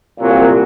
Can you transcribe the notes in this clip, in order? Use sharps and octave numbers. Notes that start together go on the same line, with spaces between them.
C2 A#2 F#3